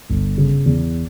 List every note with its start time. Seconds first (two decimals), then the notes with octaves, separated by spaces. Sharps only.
0.10 G1
0.38 C#3
0.66 E2